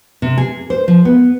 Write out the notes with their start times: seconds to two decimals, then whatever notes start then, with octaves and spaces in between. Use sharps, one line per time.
0.22 C3
0.38 G#4
0.70 C5
0.88 F3
1.05 B3